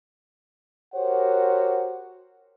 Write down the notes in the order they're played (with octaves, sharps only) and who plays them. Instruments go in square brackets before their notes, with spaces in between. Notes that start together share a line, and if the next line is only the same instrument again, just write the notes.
[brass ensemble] F#4 G4 A#4 C5 C#5 F#5